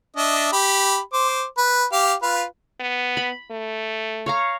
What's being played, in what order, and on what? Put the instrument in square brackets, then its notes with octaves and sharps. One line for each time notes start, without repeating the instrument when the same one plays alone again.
[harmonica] D4 D#5 E5
G4 B5
C5 D6
B4
G4 F5 D6
F4 B4 F5
[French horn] B3
[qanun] B5
[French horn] A3
[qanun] C#5 F5 A#5